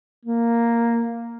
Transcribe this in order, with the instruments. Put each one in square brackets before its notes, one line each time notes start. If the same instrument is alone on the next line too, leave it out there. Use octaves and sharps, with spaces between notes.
[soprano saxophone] A#3